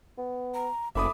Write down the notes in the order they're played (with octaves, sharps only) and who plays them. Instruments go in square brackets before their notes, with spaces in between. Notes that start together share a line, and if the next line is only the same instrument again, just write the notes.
[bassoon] B3
[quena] A#5
[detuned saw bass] F#1 [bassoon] A3 [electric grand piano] E5 B5 D#6 [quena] D6